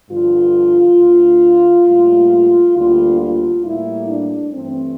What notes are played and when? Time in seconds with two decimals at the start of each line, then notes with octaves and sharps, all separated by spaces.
0.10 G2 D3 F3 F4
0.99 D2 D3 A3
1.87 A2 G3 A#3
2.76 D2 D3 G3 A#3 F4
3.20 F4
3.65 A2 G3 A#3 E4
4.08 D4
4.53 G2 E3 A3 C4